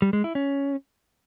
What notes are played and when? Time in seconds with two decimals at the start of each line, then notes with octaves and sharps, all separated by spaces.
0.02 G3
0.13 G#3
0.24 E4
0.35 C#4